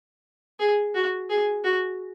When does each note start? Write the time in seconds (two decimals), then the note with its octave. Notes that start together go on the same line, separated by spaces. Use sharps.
0.59 G#4
0.95 F#4
1.30 G#4
1.64 F#4